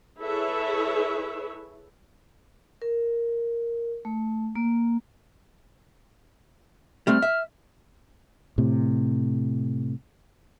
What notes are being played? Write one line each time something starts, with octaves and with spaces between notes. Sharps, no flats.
E4 G#4 A4 B4 C#5 E5
A#4
A3
A#3
G3 A3 C4 F6
E5
A2 C3